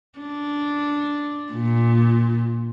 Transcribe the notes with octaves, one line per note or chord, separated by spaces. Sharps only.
D4
A#2